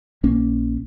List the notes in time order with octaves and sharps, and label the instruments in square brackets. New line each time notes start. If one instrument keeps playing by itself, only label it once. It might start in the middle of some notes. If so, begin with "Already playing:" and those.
[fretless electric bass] A#1 A#3 C#4